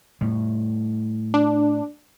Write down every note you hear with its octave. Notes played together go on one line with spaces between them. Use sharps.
A2 G3
D4